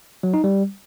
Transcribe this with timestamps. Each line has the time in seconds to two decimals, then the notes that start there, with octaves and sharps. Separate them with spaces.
0.23 F#3
0.34 D#4
0.44 G3